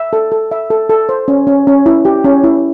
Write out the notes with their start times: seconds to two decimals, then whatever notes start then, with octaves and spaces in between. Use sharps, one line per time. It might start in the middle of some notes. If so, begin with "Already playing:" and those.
Already playing: E5
0.13 A4
0.32 A4
0.51 E5
0.70 A4
0.90 A4
1.09 C5
1.28 C#4
1.47 C#4
1.67 C#4
1.86 E4
2.05 G4
2.24 C#4
2.44 E4